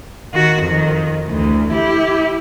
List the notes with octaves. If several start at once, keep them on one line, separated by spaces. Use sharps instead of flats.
D#3 F#4
F2 D#3
D2 E3
E4 G4